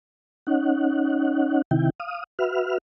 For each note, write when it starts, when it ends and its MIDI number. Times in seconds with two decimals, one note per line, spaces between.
0.47 1.62 61
0.47 1.62 63
0.47 1.62 78
1.71 1.90 48
1.71 1.90 51
1.71 1.90 64
1.71 1.90 79
2.00 2.24 77
2.00 2.24 87
2.39 2.78 66
2.39 2.78 71
2.39 2.78 76
2.39 2.78 89